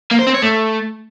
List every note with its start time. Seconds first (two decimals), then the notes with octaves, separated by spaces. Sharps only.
0.11 A#3
0.19 C5
0.27 C4
0.35 C#5
0.42 A3